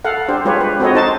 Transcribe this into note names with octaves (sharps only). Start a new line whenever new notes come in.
A4 F5 F#5
D4 G4 C5
G#3 F4 G4 B4 C#5
B4
C4 F#4 A4 C#5 D#5
D#4 C5 A5